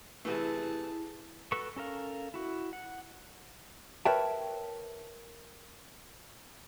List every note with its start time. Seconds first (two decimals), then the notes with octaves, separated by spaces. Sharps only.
0.25 C3 E3 A3 E4 G#4 B4 A5
1.52 F#4 A4 B4 C#6
1.76 C#4 A4 A#4 F5
2.34 E4 F#4
2.73 F#5
4.05 A#4 B4 C#5 E5 G5 A5